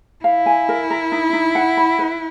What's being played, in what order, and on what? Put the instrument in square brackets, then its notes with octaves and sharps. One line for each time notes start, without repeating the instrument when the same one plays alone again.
[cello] E4 [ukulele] F5
[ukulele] G#5
A#4
A#4
D#4
D#4
F#5
B5
B4